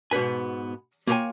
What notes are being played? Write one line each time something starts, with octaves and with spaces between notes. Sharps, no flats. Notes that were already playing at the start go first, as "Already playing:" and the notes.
G#2 B2 B3 B4 G#5
A#3 F4 C#5 D#5 G5 G#5